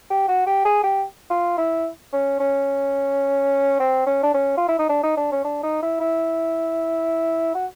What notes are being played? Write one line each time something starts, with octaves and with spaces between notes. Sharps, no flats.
G4
F#4
G4
G#4
G4
F4
E4
C#4
C#4
C4
C#4
D4
C#4
F4
E4
D#4
D4
D#4
D4
C#4
D4
D#4
E4
E4
F#4